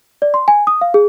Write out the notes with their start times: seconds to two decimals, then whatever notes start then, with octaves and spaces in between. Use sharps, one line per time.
0.22 D5
0.34 C6
0.48 G#5
0.67 D#6
0.81 F5
0.94 G#4